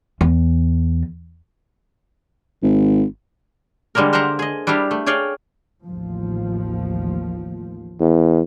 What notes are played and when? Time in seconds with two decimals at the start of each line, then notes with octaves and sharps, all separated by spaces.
0.21 E2
2.63 G#1
3.95 D3 G3 G#3 A#3 A#4
4.13 A#4 C5 E5 F#5 A#5 C6
4.39 G#4 D#5
4.67 G3 D4 E4 G4 F5
4.91 A3
5.06 G#4 C#5 D5 F5 G5
5.85 A1 D#2 F3
8.00 E2